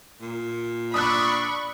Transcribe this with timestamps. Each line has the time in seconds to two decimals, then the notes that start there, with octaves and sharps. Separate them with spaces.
0.21 A#2
0.94 D4 D5 B5 C#6 D#6 E6 F#6